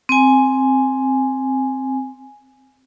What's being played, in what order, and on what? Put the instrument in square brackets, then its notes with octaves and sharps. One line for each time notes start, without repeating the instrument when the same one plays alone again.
[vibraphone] C4 G#5